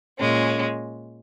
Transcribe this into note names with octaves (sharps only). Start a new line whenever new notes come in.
A#2 G#3 C#4